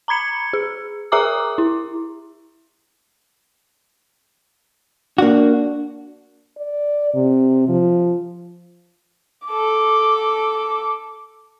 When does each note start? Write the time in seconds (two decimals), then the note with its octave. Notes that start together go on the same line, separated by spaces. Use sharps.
0.08 A#5 B5 G#6 C#7
0.53 G#4
1.12 G#4 A#4 E5 A#5 D6 D#6
1.58 E4
5.18 A#3 D4 F#4
6.58 D5
7.14 C3
7.68 F3
9.47 A4 D6